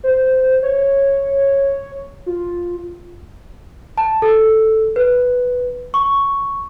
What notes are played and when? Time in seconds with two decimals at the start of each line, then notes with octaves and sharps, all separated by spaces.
0.04 C5
0.63 C#5
2.26 F4
3.98 A5
4.22 A4
4.96 B4
5.94 C#6